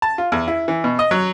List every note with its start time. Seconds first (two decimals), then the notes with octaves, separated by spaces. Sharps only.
0.02 A5
0.18 F4
0.32 E2
0.48 E4
0.68 E3
0.84 B2
0.99 D#5
1.11 F#3